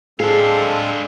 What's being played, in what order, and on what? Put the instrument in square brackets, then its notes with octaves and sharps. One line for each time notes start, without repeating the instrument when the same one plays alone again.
[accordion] G#3 C4 A4 [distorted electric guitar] D4 F5 [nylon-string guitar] G#4